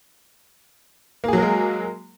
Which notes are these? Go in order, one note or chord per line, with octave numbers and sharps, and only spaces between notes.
F#3 G#3 A#3 G#4 A#4